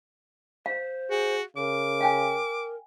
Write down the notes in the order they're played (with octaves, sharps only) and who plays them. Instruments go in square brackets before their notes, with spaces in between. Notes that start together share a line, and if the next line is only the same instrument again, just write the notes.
[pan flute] C5 [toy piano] F5
[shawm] F#4 [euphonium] G#4
[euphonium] C#3 [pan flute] A#4 [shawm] D6
[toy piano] F5 G5 G#5